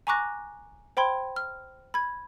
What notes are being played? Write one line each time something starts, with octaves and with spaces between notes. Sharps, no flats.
G#5 A#5 C#6 D6 F#6 A#6
C5 G5 B5 C6 G#6
F6
B5 G#6